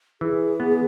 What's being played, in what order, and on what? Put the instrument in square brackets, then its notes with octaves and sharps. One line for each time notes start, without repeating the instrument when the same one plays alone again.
[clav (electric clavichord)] E3 [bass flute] G#4
[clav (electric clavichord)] B3